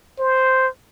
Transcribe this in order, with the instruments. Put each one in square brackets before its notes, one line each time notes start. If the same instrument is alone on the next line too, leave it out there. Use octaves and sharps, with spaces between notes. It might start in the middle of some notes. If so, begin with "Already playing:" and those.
[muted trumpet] C5